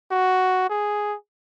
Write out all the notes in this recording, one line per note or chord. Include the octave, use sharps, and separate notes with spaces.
F#4
G#4